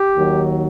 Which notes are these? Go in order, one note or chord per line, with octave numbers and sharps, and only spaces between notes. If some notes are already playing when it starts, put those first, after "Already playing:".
Already playing: G4
D#2 D#3 F#3